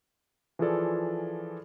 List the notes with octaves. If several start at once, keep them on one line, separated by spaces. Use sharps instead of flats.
E3 F3 F4 G#4 A4 D5